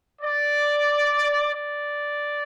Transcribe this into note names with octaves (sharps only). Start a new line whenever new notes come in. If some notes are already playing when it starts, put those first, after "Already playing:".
D5
D5